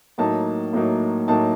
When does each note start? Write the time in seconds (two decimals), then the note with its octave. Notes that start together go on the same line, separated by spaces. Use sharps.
0.18 A2 F#3 A#3 D#4 A5
0.73 A2 F#3 A#3 D#4
1.28 A2 F#3 A#3 D#4 A5